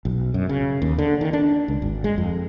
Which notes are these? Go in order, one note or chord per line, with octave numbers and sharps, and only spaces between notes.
B1
F#2
C#3
D#2
D3
D#3
D4
C#2
G#1
G#3
F2